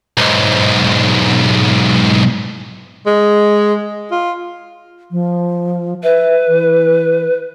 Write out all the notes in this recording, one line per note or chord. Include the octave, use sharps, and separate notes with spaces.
B1 G#2
G#3
F4
F3
B4 E5
E3